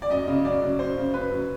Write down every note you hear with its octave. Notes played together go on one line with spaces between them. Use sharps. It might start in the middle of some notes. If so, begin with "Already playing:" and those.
D5
F#2 D#5
C#3
F#2 D5
F#3
F#2 C5
C#3
F#2 B4
F#3